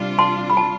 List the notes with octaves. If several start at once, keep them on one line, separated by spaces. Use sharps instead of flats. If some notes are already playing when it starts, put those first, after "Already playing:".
Already playing: C3 G3 D4 F4
A5 C6
B5
A5